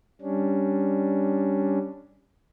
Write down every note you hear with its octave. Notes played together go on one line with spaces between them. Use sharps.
G3 C#4 D4